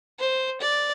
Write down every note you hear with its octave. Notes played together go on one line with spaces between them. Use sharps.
C5
D5